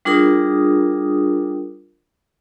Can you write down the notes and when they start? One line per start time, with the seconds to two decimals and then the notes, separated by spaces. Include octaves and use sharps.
0.05 G3 D4 F4 G#4 A#4 D#6